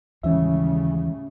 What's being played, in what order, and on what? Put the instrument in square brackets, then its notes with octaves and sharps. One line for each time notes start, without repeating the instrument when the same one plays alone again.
[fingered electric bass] D#2 E3 G#3 [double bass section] A2 C#3 G3 [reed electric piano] C#4 E5